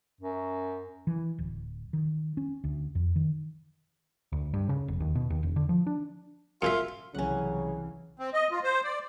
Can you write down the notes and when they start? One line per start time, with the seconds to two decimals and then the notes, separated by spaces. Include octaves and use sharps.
0.21 F#2
1.07 E3
1.39 D1
1.93 D#3
2.37 C#4
2.64 D2
2.95 F2
3.16 D#3
4.32 D2
4.54 G2
4.69 C#3
4.88 F1
5.00 D#2
5.15 B2
5.30 D#2
5.43 E1
5.56 D3
5.69 F3
5.87 D4
6.62 F#2 C#3 F4 E5
7.14 C2 C#3 E3 F#3 C#4 F#5
8.19 C4
8.34 D#5
8.51 F4
8.64 C5
8.84 D5